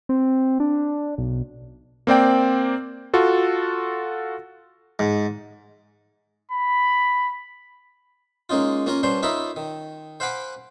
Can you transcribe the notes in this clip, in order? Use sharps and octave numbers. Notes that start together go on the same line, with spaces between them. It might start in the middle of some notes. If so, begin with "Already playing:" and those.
C4
D4
B1
A#3 C4 D5 G5
F4 F#4 A4
G#2
B5
G#3 A#3 C#4 D#4 F4
A#3 C#4 F4 A#4 G#5
G2 C#4 D4 C5 C6
D#4 F4 A#4 C#5 E5 B5
D#3
C5 F5 F#5 G#5 B5 D6